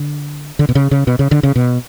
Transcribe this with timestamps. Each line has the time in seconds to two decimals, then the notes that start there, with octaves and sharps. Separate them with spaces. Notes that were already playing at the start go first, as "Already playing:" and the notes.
Already playing: D3
0.59 D3
0.69 B2
0.75 C#3
0.91 C#3
1.07 B2
1.19 C#3
1.31 D3
1.43 C#3
1.56 B2